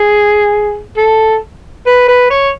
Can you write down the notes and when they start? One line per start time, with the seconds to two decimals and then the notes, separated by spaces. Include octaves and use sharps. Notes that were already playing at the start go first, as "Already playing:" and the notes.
Already playing: G#4
0.97 A4
1.86 B4
2.08 B4
2.30 C#5